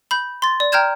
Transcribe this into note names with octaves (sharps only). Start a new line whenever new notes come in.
B5 G6
C6 A6
D5
G5 A#5 F6 G6 G#6 E7